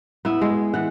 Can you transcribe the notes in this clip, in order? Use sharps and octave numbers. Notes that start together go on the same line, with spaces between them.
B3 E4
G#3
E3 F#5